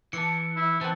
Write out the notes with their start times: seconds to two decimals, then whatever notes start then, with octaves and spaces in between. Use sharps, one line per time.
0.13 E3 A5 D6 C#7
0.56 E4
0.81 E3 C4 F#5 A5